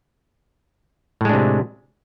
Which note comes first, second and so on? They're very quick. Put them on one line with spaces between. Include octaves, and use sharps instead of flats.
A2 G#3 D4 C3